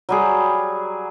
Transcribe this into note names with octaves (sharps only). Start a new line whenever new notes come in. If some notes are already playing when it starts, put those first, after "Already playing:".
F#3 G3 G#4